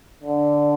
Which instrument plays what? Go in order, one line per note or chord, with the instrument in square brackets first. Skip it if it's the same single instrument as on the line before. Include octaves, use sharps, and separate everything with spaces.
[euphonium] D3